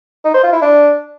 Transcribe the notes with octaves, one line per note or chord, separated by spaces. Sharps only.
D#4
C5
F4
E4
D4